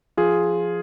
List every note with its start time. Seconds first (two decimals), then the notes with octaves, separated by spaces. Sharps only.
0.17 F3 F4 G#4